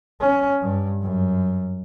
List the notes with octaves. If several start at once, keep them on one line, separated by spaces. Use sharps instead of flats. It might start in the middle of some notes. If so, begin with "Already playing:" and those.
C#4
G2
F#2